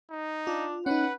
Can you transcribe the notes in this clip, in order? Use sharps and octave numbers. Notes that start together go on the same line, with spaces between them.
D#4
D4 F4
C#4 D#4 B4 F#5